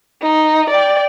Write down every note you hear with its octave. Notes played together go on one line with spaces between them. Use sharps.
D#4
D5 G5